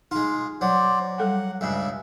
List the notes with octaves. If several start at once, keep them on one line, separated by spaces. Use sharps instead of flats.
G#3 D#4 F4
F#3 C5 D5
G3 A4 F#5 G5
C#2 G2 C#3 E5